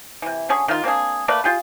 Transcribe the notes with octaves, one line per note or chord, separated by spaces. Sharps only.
C3 E3
D3 C#4 G#4 C#6
D#3 F4
A#3 C4 D4 G#4
A3 A#3 B4 D5
F4 G4 G#4